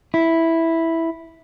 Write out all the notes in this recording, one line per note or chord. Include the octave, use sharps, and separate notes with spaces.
E4